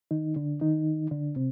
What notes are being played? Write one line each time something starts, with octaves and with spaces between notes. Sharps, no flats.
D#3 D#4
D3 D4
D#3 D#4
D3 D4
C3 C4